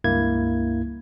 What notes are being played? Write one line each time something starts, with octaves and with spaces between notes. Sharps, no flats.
C#2 G2 A#3 E4 G#6